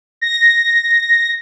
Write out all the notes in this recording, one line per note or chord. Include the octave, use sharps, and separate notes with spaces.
A#6